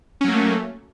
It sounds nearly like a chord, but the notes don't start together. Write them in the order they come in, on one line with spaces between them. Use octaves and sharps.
C#4 F#3 A#3 A3